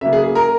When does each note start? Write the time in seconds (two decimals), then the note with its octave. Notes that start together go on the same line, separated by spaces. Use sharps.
0.01 C#3 F#3 A#3 E5
0.13 G#4
0.24 G#4
0.35 A#4